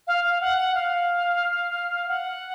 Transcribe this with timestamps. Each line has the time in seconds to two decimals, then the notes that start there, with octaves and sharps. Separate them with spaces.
0.07 F5
0.24 F5
0.41 F#5
0.58 F#5
0.74 F5
2.08 F#5